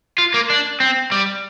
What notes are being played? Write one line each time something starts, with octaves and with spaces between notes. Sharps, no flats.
F4
A#3
D4
C4
G3